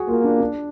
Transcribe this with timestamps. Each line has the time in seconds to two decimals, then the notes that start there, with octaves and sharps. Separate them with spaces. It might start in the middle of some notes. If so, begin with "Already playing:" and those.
Already playing: F#4 G#4
0.08 A#3 F4
0.24 D4
0.41 D4